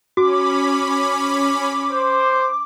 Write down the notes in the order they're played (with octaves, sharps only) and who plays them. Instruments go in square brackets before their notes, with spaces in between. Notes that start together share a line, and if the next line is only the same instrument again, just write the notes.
[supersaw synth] C#4 B5 [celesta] F#4 [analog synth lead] D6
[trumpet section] C5